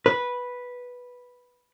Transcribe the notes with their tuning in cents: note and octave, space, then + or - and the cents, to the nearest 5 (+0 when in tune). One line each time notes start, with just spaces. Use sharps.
B4 -5